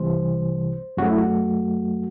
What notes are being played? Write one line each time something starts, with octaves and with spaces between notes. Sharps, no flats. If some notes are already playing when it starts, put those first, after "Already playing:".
Already playing: C2 C3 E3 G3 C5
F#2 F#3 A3 F#4
E4
F#4